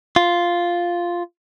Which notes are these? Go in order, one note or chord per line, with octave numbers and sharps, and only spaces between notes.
F4